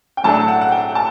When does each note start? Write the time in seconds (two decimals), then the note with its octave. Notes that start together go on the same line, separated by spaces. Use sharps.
0.17 G5
0.24 A2 F#3 A3 D4 A5
0.48 F#5
0.61 F#5
0.72 G5
0.95 A5